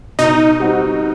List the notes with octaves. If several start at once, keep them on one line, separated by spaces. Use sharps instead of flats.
B2 D#4
G3 C4 F#4